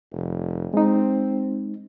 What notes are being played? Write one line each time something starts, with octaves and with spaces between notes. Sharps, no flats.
F1
G#3 C4 D#4